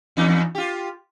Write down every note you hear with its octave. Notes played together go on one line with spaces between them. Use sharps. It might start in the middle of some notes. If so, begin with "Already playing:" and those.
E2 D#4
F4 G4